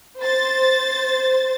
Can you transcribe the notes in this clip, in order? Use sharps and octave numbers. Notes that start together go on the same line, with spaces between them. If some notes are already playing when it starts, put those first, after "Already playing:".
C5 A6